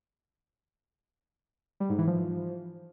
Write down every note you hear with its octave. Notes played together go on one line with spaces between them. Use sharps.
G3
G#2
E3
F3